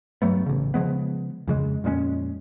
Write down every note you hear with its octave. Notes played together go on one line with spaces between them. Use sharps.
G2 F#3 A3 B3
A1 C#3
C#3 F3 G#3 B3
F2 C#3 G#3
F2 A#2 G#3 C#4